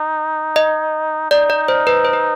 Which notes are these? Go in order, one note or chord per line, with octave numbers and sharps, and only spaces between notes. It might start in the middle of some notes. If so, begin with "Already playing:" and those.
Already playing: D#4
D#5
D#4 D5
D5
C5
B4
C5
B4